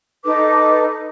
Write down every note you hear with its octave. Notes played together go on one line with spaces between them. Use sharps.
D#4 A4 B4 D6